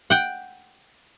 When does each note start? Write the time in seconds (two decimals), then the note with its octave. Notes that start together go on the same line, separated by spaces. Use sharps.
0.10 F#5 G5